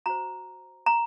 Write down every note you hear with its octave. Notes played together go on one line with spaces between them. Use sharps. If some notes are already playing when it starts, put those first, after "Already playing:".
F#4 C5 A#5
A#5